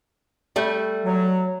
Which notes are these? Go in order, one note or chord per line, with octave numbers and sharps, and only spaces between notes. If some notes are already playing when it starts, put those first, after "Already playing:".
G3 A3
F#3